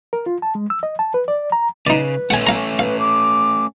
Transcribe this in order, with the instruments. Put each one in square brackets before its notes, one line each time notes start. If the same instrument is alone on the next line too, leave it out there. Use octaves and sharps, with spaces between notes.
[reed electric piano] A#4
F4
A5
G#3
E6
D#5
A5
B4
D5
A#5
[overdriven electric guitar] C#3 [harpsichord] D#4 D5 [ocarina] B4
[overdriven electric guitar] A3 C#4 [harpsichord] F#5 G#5
[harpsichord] F5 A#5
[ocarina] B4 [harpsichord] F5
[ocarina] D6